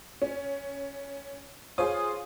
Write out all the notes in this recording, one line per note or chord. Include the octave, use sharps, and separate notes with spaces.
C#4
F4 G#4 C5 C#5 D#6